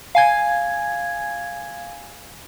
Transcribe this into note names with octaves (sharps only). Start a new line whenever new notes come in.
F5 G#5 G#6